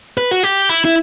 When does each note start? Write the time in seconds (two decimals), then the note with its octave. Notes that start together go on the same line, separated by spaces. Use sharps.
0.18 B4
0.31 F#4
0.43 G4
0.69 E4
0.85 E4